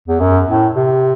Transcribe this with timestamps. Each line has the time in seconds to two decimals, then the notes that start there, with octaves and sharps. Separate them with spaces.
0.08 E2
0.20 F#2
0.48 A2
0.75 C3